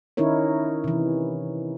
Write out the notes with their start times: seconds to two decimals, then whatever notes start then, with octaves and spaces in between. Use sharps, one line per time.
0.17 D#3 C#4 D#4 E4 A#4 C#5
0.84 C3 E3